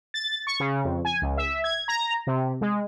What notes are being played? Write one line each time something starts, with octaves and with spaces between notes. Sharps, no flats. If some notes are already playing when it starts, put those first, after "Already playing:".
A6
C#6
C#3
F2
G#5
C#2
E5
G#6
A#5
C3
G#3